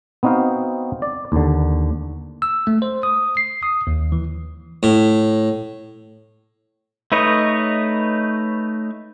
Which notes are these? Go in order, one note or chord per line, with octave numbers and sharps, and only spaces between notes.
B3 C4 D#4 F#4 F5 G5
D5
D#2 D3
E6
A3
C5
D#6
C7
D#6
D#2
E3
A2
A3 D#4 B4 C#5 D#5